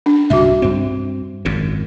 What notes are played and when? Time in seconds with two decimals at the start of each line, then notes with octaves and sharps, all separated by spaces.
0.06 D4
0.30 C2 G2 F#4 E5
0.62 G2 C4
1.45 G#1 F#2 A#2